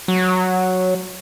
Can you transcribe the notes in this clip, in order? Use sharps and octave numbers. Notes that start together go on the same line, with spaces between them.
F#3